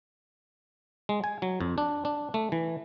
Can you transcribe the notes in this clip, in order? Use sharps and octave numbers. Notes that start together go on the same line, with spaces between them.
G#3
G#5
F#3
F2
D4
D4
A3
E3